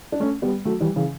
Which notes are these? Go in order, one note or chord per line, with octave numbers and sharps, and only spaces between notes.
D4
A3 C#4
G3 B3
F#3 A3
E3 G3
C#3 E3